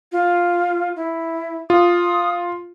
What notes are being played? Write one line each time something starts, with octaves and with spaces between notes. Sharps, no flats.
F4
E4
F4 D#6